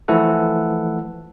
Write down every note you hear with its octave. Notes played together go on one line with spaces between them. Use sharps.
E3 F3 A3 E4 A4 F#5